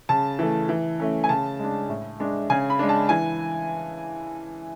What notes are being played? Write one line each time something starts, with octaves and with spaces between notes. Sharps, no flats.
C#3 A5
E3 A3
E3
A3 C#4
G#5
C#3 A5
G#3 D4
A2
G#3 D4
C#3 G#5
B5
G#3 D4
A5
E3 G#5